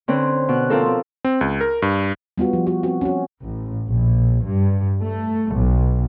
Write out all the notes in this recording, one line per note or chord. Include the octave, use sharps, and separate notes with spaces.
D3 C4 C#4 B4
B2 F#6
B2 F3 C4 F4 A4 A#4
C4
C4
C#2
A#4
G2
G3 B3 F4 F#4
F3
F#4
C4 F#4
C#4 F#4
A1
A#1
G2
A3
B1